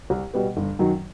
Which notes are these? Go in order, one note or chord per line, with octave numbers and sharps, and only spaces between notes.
C2
B2 G3 B3
G1
F#2 D#3 F#3